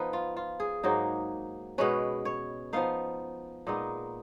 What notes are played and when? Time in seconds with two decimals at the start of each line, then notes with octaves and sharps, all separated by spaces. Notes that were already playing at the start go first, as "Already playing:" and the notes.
Already playing: F3 B3 D#4 B4
0.13 F4
0.37 F4
0.60 G#4
0.83 G#2 F#3 A#3 D#4
1.78 B2 G#3 C#4 B4
2.25 C#5
2.73 F3 B3 D#4 F5
3.67 A#2 G#3 B3 D#4 D#5